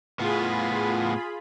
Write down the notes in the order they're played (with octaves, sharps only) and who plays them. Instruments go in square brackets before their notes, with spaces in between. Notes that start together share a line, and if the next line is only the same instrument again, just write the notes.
[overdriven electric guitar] A2 B3 [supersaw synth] F4 G#4 B5